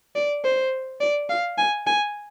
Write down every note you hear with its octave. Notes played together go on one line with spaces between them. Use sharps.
D5
C5
D5
F5
G#5
G#5